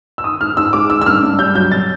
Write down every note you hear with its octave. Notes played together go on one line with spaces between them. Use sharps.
E6
D#3 D#6
G#2 F6
G#2 E6
G#3 D6
D#3 E6
E6
G2 F6
G2
G3 G6
F#3 G6
B2 A6